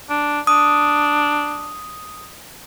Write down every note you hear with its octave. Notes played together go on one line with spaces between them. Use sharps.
D4
D4 D#6